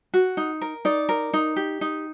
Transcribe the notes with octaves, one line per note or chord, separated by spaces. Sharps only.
F#4
D#4
A#4
D#4 D5
A#4
D#4
G4
D#4